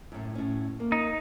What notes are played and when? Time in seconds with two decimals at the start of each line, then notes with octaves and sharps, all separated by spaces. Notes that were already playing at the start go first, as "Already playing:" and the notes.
0.12 F#2 A2
0.35 A2 C#4
0.80 A#3
0.92 D#4